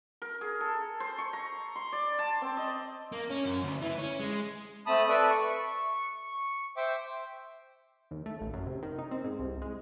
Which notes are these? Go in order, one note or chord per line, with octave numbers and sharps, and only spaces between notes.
A#4
G#4
A4
C5
C#6
A#5
C6
D5
A5
C4
D#5
A#3
C#4
F#2
D2
E3
C#4
G#3
A3 C4 A5 B5 D#6
A4 B4 D5 E5
C#6
C5 E5 G5 D6
D#2
A3
A1
F#2
C3
D#3
D#4
C4
G#2
C2
G#3